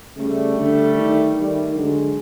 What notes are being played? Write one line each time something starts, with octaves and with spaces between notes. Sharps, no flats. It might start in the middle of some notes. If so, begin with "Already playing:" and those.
C#3 G3 A3
D3
D#3
D#3 G3 A3
D3 F#3 G#3